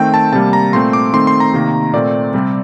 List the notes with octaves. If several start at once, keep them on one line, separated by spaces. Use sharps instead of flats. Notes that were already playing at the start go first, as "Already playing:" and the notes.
Already playing: D#3 A3 C4 G5
A5
C3 G3 A#3 A5
A#5
A#2 A3 C4 C6
D6
D#3 A3 C4 C6
C6
A#5
C3 D#3 A#3
A#2 A3 C4 D5
C3 G3 C4